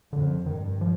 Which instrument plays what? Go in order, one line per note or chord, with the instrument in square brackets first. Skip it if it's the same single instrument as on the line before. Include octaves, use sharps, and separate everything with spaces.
[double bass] F2 [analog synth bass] D3
[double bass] G2 [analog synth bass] D#3
[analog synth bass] F3